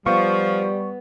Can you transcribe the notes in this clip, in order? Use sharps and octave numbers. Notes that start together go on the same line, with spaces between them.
F3 G3 B3 C#6